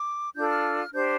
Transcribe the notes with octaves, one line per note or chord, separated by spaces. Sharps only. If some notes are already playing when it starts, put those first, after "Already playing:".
Already playing: D6
D4 F4 A4 G6
F6
D4 G4 C5 G6